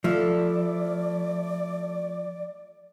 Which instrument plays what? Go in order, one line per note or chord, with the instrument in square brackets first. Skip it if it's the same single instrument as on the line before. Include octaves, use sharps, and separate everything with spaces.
[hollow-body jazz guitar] F3 [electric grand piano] A3 [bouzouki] E4 A4 [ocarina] D5